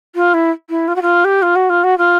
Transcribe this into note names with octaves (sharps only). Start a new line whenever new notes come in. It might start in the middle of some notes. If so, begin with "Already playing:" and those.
F4
E4
E4
F4
F#4
F4
G4
F4
F#4
F4
F#4
F4